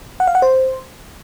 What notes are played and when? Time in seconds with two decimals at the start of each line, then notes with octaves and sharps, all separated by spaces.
0.20 F#5
0.27 F5
0.35 F#5
0.42 C5